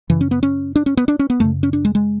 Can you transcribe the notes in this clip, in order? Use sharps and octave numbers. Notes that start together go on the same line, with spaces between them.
F#2 C#3 E3
C#4
B3
C#4
D4
C#4
B3
D4
C#4
B3
F#2 C#3 A3
C#4
D4
G#3
G#3